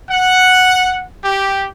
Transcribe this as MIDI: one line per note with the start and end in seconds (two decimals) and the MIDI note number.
0.11 1.04 78
1.24 1.68 67